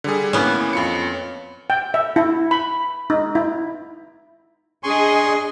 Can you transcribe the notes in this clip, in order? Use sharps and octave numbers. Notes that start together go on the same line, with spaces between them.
D3 G3 G#4
A2 E3 A#3 B3 C#4
F2 F4 C#7
G5
E5
E4
B5
D#4
E4
D4 G#4 D#5 G#5 C6 C#6